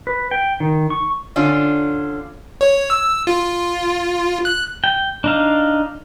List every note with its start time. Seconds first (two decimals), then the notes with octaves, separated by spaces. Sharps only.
0.07 B4
0.31 G5
0.60 D#3
0.90 C#6
1.36 D3 C#4 D4 F4
2.61 C#5
2.90 E6
3.27 F4
4.45 F#6
4.84 G5
5.24 D4 D#4 F5